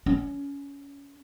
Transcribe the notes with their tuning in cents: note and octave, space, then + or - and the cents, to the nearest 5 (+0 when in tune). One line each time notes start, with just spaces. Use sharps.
C#4 +20